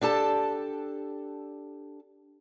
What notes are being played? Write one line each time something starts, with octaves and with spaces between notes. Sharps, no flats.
D4 G4 A4 A5